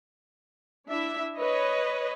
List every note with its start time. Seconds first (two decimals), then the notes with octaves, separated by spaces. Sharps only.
0.88 D4 E4 E5
1.38 B4 C#5 D#5